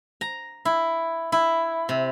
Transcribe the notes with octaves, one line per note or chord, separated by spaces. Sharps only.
A#5
E4
E4
C3